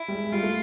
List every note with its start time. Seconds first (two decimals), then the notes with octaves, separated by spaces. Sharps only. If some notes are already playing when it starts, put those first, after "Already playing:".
Already playing: E4
0.08 G3
0.12 G#3
0.24 G#3
0.32 G3 F4
0.43 A3